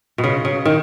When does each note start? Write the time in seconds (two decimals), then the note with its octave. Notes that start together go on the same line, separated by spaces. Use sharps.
0.18 B2
0.24 C#3
0.45 C#3
0.65 D#3